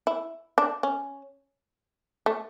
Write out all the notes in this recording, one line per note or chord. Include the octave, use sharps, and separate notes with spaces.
E4
D4
C#4
A3